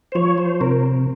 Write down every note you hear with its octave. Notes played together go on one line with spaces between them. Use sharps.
C5
F3 C#5
C5
C3 A#4